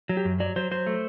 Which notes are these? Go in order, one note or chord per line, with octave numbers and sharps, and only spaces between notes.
F#3
G4
F#2
F#3 D5
F#3 C5
F#3 C5
A3